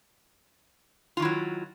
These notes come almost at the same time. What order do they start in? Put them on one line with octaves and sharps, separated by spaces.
F4 D#3 E4 F#3